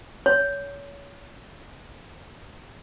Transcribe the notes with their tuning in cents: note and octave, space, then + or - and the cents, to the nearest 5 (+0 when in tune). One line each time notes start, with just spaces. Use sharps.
C#5 +30